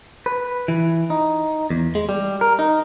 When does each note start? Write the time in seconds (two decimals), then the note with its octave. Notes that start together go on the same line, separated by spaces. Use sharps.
0.26 B4
0.68 E3
1.10 D#4
1.70 E2
1.95 G#3
2.09 G3
2.41 A#4
2.59 D#4